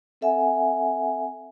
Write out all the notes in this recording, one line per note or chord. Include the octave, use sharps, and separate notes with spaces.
C4 A4 E5 F#5 G#5